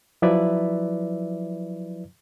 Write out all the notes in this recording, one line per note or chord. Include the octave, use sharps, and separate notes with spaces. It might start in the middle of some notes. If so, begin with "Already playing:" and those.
F3 F#3 E4 B4 D5 E5